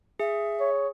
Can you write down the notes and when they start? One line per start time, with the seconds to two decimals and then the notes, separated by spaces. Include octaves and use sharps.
0.20 G#4 E5
0.60 C#5